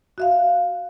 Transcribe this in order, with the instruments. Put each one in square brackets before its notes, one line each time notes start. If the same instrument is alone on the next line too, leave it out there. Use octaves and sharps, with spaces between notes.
[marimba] F#4 E5 F5